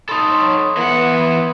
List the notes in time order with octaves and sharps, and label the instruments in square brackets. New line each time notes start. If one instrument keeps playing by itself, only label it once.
[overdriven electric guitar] D#4 A4 [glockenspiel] B5 C6 D#6
[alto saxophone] C#5
[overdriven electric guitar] E3 F#5 [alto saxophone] B3